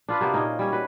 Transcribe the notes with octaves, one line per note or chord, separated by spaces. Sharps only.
D4 F4 B4
C3 A#3 B3
A#2 C#4 D#4
G3 C#4
F#4 B4